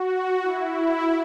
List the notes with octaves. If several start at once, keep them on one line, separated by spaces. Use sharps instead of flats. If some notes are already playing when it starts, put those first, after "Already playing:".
Already playing: F#4
E4